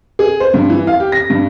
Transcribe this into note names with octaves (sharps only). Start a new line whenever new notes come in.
G#4
C5
G2
E3
F5
G4
A#6
G2